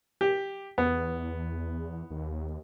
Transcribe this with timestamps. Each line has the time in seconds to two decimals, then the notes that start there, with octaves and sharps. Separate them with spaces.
0.21 G4
0.78 E2 B3
2.10 D#2